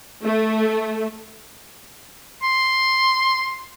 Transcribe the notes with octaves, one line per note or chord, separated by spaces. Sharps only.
A3
C6